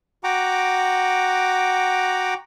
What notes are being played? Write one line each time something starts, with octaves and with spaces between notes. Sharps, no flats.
F#4 F#5 G5 A#5 D6